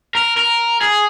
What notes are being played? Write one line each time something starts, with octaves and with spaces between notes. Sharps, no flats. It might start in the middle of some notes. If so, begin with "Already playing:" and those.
A#4
A#4
G#4